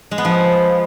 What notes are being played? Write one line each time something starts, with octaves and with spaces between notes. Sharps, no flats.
G#3
B3
F3